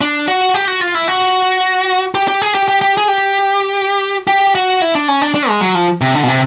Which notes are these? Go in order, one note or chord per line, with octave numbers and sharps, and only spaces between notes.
D4
F#4
G4
F#4
F4
E4
F#4
G4
G4
G#4
G4
G4
G4
G#4
G4
G4
F#4
E4
D4
C#4
D4
D4
G#3
F#3
F3
C3
D3
B2
C3